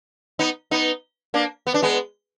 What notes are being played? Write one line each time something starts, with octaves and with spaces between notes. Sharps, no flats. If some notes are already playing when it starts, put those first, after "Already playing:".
B3 D#4
B3 D#4
A#3 D4
B3
D4
G#3 B3